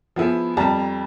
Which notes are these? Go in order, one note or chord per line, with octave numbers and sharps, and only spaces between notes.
F3 B3 E4 G#4
F2 G3 A5 A#5